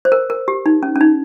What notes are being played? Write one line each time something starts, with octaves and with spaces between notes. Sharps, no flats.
C5
A#4
A#4
G4
D#4
C#4
C#4
D#4